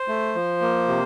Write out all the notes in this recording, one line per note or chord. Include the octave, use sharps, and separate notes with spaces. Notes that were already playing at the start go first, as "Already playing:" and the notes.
Already playing: C5
A3
F3
A#3
C3